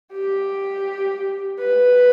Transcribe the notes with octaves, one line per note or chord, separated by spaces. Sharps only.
G4
B4